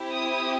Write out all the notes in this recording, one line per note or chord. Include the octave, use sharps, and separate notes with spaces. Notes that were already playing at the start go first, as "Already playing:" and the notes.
Already playing: C4 E4 G4
D#6